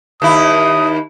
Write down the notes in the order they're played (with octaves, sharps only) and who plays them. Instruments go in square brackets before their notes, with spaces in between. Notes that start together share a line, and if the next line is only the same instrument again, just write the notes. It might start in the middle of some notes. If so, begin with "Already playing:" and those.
[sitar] D#2 E4 [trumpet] D#6